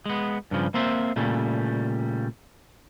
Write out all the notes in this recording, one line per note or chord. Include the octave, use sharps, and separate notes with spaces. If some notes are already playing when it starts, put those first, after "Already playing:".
G#3 B3
G2 C#3 F3
A#3 C4 C5 E5
A#2 C#3 G3 A3